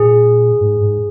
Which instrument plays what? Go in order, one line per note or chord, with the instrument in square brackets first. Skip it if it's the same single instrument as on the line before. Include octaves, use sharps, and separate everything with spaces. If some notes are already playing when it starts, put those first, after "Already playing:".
Already playing: [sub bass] A#2 [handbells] G#4
[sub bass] G#2
G#2